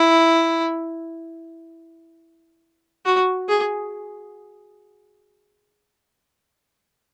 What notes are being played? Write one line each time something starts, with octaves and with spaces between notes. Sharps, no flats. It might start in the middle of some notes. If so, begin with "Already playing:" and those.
Already playing: E4
F#4
G#4